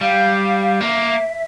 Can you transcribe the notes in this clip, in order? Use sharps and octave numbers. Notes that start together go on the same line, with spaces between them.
G3 F5
A#3 E5